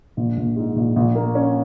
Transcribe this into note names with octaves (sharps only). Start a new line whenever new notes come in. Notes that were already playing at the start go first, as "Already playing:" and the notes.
A#1
A#1
G#2
A#1
A#1
A#3
C#4